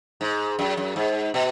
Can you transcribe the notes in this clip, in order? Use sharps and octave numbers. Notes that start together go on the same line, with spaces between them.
G#2
F#2
F#2
G#2
B2